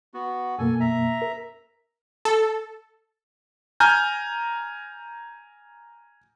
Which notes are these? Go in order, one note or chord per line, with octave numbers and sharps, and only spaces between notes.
B3 F#4
F#2 B2 A#3 A4 G#5
E5 A#5
A#4
A4
G#5 A#5 F6 G6